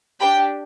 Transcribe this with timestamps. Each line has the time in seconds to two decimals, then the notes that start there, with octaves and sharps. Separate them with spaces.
0.20 D4 G4 G5 B5